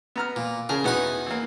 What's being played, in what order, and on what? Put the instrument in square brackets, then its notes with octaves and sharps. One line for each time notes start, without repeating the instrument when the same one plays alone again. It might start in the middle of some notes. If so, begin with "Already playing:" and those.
[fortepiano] B3 A#5 F6
[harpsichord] A#2
[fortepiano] C#3 G#4 A5 [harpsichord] A#4
[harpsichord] E2 F#5 G#5 [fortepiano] B3 D#4 F#4
[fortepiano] E3 A#3